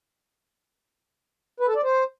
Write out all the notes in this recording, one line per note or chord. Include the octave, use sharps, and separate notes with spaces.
B4
A4
D5
C5